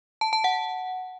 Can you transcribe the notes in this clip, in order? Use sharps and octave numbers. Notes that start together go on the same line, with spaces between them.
A5
A5
F#5